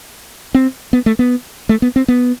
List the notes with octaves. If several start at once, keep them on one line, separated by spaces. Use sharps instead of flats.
C4
B3
A3
B3
A3
B3
C4
B3